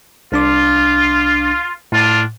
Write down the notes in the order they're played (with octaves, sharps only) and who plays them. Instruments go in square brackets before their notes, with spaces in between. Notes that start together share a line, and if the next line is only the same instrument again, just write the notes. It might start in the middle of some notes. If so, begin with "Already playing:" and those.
[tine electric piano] C2 D4 D6 [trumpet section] F4
[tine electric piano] A2 [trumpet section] D4 F4